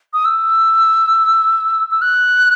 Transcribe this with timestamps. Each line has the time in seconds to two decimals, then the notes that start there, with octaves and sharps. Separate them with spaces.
0.13 D#6
0.25 E6
1.91 E6
2.02 F#6